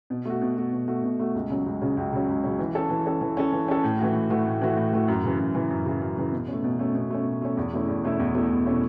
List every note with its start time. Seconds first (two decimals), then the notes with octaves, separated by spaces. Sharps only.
0.10 B2
0.25 A3 F#4
0.42 B2
0.57 A3 F#4
0.72 B2
0.88 A3 F#4
1.04 B2
1.20 A3 F#4
1.35 C#2
1.50 C#3 F#3 C#4
1.66 C#2
1.81 C#3 F#3 C#4
1.97 C#2
2.13 C#3 F#3 C#4
2.28 C#2
2.44 C#3 F#3 C#4
2.59 E3
2.75 C#4 A4
2.90 E3
3.06 C#4 A4
3.21 E3
3.37 C#4 A4
3.52 E3
3.68 C#4 A4
3.84 A2
3.99 E3 A3 F#4
4.15 A2
4.30 E3 A3 F#4
4.46 A2
4.61 E3 A3 F#4
4.77 A2
4.93 E3 A3 F#4
5.08 F#2
5.23 C#3 E3
5.39 F#2
5.54 C#3 E3
5.70 F#2
5.86 C#3 E3
6.01 F#2
6.17 C#3 E3
6.32 B2
6.48 A3 C#4
6.64 B2
6.79 A3 C#4
6.95 B2
7.10 A3 C#4
7.26 B2
7.41 A3 C#4
7.57 E2
7.73 B2 A3 C#4 E4
7.88 E2
8.03 B2 A3 C#4 E4
8.19 E2
8.34 B2 A3 C#4 E4
8.50 E2
8.66 B2 A3 C#4 E4